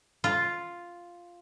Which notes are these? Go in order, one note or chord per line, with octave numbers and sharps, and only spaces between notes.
F4